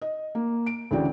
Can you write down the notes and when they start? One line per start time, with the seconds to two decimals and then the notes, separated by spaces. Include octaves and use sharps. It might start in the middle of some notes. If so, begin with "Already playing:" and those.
0.02 D#5
0.35 A#3
0.66 D7
0.91 D2 C#3 E3 F#4 D5 G5